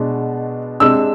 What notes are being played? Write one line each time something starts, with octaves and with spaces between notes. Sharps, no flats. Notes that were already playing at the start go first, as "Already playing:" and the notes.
Already playing: B2 G#3 D4
C3 G#3 D4 E6